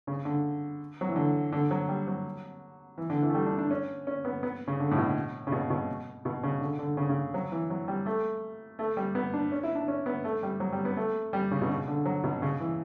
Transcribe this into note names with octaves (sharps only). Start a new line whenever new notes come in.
C#3
D3
F#3
E3
D3
D3
F#3
G3
F#3
E3
D3
E3
A3
G3
D4
D4
C#4
C#4
B3
B3
C#3
D3
A2
B2
C#3
B2
B2
B2
C#3
D3
D3
C#3
C#3
F#3
E3
F#3
G3
A3
A3
G3
B3
D4
C#4
E4
D4
C#4
B3
A3
G3
F#3
G3
B3
A3
G3
C#3
B2
C#3
D3
F#3
B2
C#3
E3